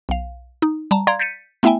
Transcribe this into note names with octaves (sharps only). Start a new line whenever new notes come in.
B1 F5
D#4
G3 A5 A#5
D5 F5 A#5 C6 G#6
G6 A6 B6 C#7 D#7
A3 B3 E4 E5 G5 G#5